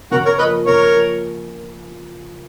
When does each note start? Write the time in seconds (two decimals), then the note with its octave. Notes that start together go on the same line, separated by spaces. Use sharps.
0.11 C#3 F#4 A#4
0.25 A#4 C#5
0.38 F3 A#3 B4 D#5
0.65 C#3 A#4 C#5
0.93 F3 A#3